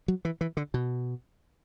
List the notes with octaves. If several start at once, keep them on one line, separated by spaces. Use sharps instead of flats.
F#3
E3
E3
D3
B2